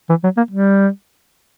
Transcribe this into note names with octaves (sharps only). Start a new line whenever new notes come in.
E3
F#3
A#3
G3